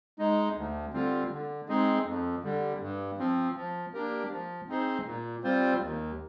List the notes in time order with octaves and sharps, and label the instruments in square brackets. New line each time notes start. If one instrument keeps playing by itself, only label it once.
[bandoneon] G#3 D#4
D2
D3 G3 C4 F4
D3
G#3 C4 D#4 G#4
F2
D3 G3
G2
F3 C4
F3
A#3 D4 G4 A#4
F3
C4 D#4 G#4 C5
A#2
G3 C4 F4 C5
D#2